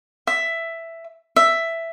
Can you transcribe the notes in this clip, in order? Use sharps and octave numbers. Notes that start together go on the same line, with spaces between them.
E5
E5